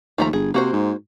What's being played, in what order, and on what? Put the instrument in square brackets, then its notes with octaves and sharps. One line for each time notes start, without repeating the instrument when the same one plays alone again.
[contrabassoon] D#2 [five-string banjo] F3 A3 A#5
[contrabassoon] G1 [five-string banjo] G#4
[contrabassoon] C3 [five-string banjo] A#3 F#4 C5
[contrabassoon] G#2